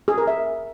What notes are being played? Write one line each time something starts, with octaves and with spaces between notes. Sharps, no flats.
G#4
A#4
E5